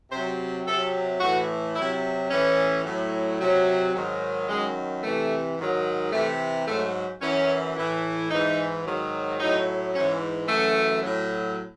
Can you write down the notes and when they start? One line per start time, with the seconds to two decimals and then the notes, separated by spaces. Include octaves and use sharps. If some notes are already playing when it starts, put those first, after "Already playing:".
0.11 C3 F#3 C5
0.66 C3 F#3 A4
1.21 A2 E3 F#4
1.76 C3 F#3 E4
2.30 A2 E3 C#4
2.84 A2 F#3
3.40 C3 F#3
3.94 G#2 D#3 F#3
4.49 F#2 D#3 F#3 G#3
5.03 C3 E3 A3
5.58 G#2 D#3 F#3
6.12 C3 E3 A3
6.67 G#2 F#3 A3
7.21 F#2 E3 C#4
7.76 A2 E3
8.31 G#2 E3 D#4
8.85 G#2 D#3 F#3
9.40 A2 F#3 D#4
9.94 G#2 E3 C#4
10.49 F#2 E3 A3
11.03 A2 F#3